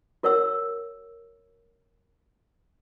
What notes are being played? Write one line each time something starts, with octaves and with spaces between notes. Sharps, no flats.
F#4 A#4 C#5 F#5 E6